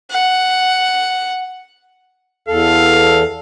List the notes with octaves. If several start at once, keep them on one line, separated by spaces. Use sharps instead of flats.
F#5
E2 A4 F5